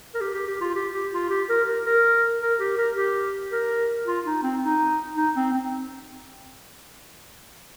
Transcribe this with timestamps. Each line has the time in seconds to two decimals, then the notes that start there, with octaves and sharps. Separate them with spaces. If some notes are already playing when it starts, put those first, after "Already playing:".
0.14 A#4
0.21 G4
0.34 G4
0.47 G4
0.61 F4
0.75 G4
0.94 G4
1.13 F4
1.30 G4
1.49 A#4
1.68 A#4
1.86 A#4
2.41 A#4
2.60 G4
2.78 A#4
2.96 G4
3.52 A#4
4.07 F4
4.25 D#4
4.43 C4
4.62 D#4
5.17 D#4
5.36 C4
5.54 C4